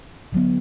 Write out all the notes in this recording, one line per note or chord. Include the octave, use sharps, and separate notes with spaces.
D3 F#3 B3